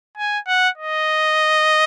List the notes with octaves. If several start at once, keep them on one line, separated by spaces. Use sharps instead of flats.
G#5
F#5
D#5